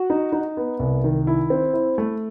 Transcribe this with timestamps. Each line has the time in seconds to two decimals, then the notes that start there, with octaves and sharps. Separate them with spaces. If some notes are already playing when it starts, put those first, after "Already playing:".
Already playing: F#4
0.10 D#4
0.32 D#4
0.57 B3
0.79 C2
1.04 D#3
1.27 E4
1.50 C4
1.73 E4
1.98 A3